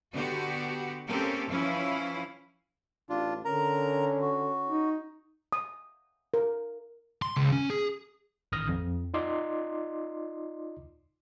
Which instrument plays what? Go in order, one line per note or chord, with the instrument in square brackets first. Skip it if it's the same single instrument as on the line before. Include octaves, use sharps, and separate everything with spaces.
[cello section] D3 B3 F#4 G4
A#3 C4 C#4 G4 A4 A#4
E3 F3 C#4 E4 F5
[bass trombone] A1 [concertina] D4 F4
[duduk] D3 [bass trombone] C#4 [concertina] A#4 A#5
[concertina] F#4
[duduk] D#4
[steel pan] D#6
A#4
[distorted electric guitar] C6
C#2
C#4
G#4
[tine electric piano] A1 D#3 D#6 F6 A#6
F2
D#4 F4 D5 D#5 C6 D6